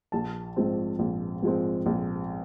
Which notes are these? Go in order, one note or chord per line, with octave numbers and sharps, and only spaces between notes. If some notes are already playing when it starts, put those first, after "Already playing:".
A#1 A5
G#2 F3 G#3 C4
A#1
G#2 F3 G#3 C4
A#1